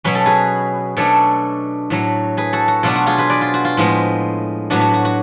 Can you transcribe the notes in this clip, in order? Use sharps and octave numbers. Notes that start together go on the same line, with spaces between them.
B2 F#3 C#4 B4
A4
G#4 B4
B2 A3 D4 A4 C#5
A2 F#3 A3
G#4 B4
F#4 A4
F#4
B2 F#3 B3 D4 F4
F#4
F4 G#4
G#4 B4
B4 D5
F4
F#4
F4
A2 F3 G#3 B3
A2 F#3 B3 D4 F#4
F#4
F#4
F#4